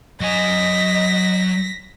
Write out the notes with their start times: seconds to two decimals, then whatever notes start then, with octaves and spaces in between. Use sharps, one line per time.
0.21 F#3 D#5 G#5 A#6 B6